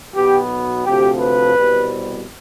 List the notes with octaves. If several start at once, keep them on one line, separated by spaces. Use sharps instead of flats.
B1 B2 B3 G4
D2 C3 F3 G4
B4
C2 B2 G3 C4